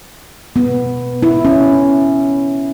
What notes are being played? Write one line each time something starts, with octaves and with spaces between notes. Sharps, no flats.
B3
E4
C#4